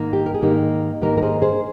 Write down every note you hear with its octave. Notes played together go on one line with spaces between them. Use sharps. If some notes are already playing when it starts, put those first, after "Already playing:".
Already playing: G#2 D#3 A#3 D#4
G4
A#4
G#4
G#2 D#3 A#3 D#4 G4
G#2 D#3 A#3 D#4 G4 A#4
A#4
G#4 C5
G#4 C5